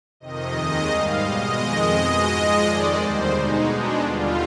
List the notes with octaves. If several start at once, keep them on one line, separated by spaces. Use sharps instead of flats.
F2 C3 D#3 D#5
D#2 D#3 G#3
G#2 G3 F5
B2 G#3 D#5
F2 D#3 G#3 D#5
B2 G#3
G#2 F3 G#3
F2 D#3 G#3 D5
D#2 D3 G3 C5
B2 G#3 D#4
B2 G#3 D4
D#2 D3 G3 F4